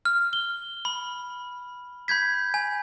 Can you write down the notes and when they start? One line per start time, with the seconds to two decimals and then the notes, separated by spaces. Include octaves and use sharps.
0.05 F6
0.33 G7
0.85 B5
2.08 B5 G6 G#6 B6
2.54 G#5